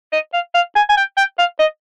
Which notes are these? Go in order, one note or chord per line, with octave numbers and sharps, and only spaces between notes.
D#5
F5
F5
G#5
G#5
G5
G5
F5
D#5